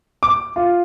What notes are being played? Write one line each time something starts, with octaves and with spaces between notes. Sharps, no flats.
D6
F4